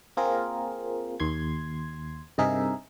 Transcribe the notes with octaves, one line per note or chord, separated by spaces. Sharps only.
A#3 C4 F4 G#4 A#4
D#2 C6 G#6
G2 C3 D#4 G#4 A#4 E5